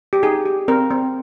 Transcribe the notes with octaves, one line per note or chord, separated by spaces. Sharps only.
G4
D#4 G#4
G4
C4 A#4
C4